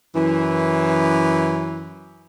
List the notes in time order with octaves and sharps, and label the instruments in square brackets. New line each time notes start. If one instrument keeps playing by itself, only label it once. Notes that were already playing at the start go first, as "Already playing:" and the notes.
[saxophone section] F#2 E3